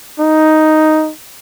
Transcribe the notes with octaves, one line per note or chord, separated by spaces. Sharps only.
D#4